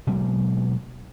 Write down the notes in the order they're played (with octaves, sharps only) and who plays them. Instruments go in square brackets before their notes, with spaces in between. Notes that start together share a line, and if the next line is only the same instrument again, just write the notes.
[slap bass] B2 F#3 G#3 A#3